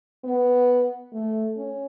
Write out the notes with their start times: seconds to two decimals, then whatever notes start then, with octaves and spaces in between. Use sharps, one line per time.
0.24 B3
1.13 A3
1.57 C#4